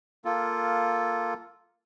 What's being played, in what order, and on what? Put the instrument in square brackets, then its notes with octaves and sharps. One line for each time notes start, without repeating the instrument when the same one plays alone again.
[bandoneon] A#3 F4 A4